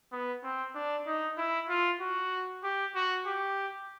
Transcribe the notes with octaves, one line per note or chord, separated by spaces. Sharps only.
B3
C4
D4
D#4
E4
F4
F#4
G4
F#4
G4